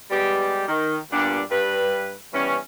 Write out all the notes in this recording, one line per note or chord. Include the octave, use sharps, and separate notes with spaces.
G3 G#3 B3 G4
D#3
G2 A#2 G3 B3 D4
G2 B4
E3 G3 B3 C#4